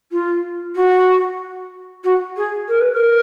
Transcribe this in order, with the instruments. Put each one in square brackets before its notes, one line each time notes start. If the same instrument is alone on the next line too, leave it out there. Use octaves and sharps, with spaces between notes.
[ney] F4
F#4
F#4
G#4
A#4
B4
A#4